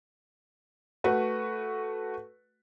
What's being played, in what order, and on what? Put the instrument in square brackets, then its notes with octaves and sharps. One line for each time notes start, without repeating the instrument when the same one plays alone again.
[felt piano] A3 F#4 B4 F#5